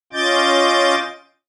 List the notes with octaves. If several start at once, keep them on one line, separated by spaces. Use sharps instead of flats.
C#4 F4 D#5 D6 G6 A6